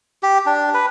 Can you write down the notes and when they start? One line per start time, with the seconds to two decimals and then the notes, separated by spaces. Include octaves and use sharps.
0.23 G4
0.46 D4
0.74 B4